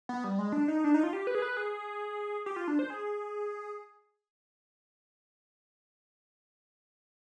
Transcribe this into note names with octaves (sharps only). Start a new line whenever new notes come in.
B3
G3
G#3
D4
D#4
D4
D#4
F4
G4
B4
G#4
B4
G#4
G4
F4
D4
C5
G#4